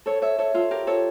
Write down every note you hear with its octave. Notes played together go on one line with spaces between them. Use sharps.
A4 C#5
C#5 E5
A4 C#5
F4 A4
G4 A#4
A4 C#5